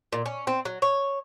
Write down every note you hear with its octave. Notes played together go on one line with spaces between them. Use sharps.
A#2
C#4
C4
F#3
C#5